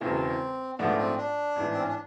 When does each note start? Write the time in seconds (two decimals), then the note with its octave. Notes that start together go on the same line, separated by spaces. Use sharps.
0.01 E1 E2 C#3 E3 C4
0.78 A#1 G#2 F3 A3 B3 D4
0.98 C4
1.18 D4
1.56 A1 G#2 E3
1.74 C4
1.80 C#4
1.88 D4